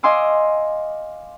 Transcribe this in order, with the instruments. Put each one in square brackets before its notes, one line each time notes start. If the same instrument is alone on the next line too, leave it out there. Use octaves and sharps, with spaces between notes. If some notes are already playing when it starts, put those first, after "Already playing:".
[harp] D#5 F5 G#5 C6 D6 E6